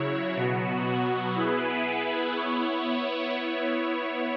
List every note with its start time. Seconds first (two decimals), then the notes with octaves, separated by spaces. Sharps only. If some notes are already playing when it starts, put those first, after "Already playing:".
Already playing: C#3 F#3 E4 C#5
0.36 B2 F#3 B3 F#4
1.35 B3 E4 G#4 B4
2.33 B3 E4 C#5